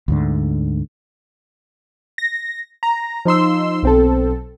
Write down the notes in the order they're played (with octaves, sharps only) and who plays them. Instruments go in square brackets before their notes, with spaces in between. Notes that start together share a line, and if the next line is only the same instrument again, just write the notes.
[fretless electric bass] D2 G#2 D3
[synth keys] A#6
A#5
F3 D#4 C6 E6
B1 C4 A4